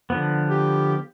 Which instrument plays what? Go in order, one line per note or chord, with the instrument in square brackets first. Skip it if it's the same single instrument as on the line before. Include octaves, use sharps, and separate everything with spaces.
[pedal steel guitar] D3 F3 B3
[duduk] G4